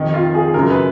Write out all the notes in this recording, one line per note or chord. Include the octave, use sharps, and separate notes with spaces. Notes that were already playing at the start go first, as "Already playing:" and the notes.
Already playing: F2 D#3
F4
G#4
F#2 C#3 A#4
B4